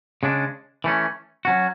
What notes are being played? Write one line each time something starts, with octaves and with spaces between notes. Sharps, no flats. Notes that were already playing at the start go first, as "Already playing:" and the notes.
C#3 G#3 D4
E3 A3 C#4
F#3 C#4 F#4